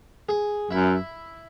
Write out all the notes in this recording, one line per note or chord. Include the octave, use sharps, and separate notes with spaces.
G#4
F#2 E4